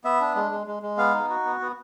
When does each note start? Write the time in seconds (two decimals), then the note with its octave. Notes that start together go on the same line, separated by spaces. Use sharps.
0.04 B3 E5
0.20 D4
0.35 G#3
0.51 G#3
0.67 G#3
0.83 G#3
0.98 B3 F5
1.14 D#4
1.30 F#4
1.45 B3
1.60 B3